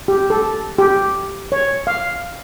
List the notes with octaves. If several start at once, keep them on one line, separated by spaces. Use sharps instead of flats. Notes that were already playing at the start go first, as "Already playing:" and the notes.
G4
A4
G4
C#5
F5